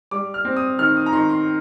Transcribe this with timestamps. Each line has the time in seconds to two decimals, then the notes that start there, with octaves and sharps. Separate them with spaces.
0.11 G3 D6
0.34 F6
0.45 C4
0.57 D#6
0.79 D#3 F6
0.97 D#6
1.06 A#5
1.13 D#3 C6
1.29 C6